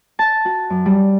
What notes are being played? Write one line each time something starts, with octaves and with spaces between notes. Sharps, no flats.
A5
F#4
F#2
G3